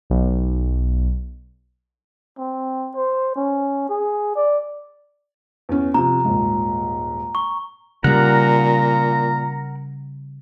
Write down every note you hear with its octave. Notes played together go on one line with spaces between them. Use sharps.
B1
C4
C5
C#4
G#4
D5
E2 C#4
C3 F3 A#5
D#1 G#2
C#6
A#2 C#3 G3 A#4 F#5 A#5